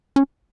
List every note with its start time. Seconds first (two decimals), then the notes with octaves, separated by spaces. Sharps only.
0.16 C#4